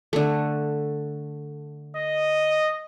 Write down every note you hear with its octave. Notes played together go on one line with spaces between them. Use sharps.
D3 A3
D#5